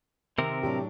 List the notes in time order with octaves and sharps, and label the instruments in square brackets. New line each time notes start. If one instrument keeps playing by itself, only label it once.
[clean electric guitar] C3 [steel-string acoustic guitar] D#3 [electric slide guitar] C4 A#4
[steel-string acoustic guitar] A2 F#3 D4 [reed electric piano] G4